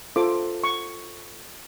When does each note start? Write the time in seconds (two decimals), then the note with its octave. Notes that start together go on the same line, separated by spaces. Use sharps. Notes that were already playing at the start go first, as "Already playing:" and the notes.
0.16 F4 A4 C5 D6
0.64 C#6